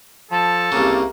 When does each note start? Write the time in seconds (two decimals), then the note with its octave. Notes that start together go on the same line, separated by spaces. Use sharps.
0.31 F3 A4
0.72 C2 C#3 A#3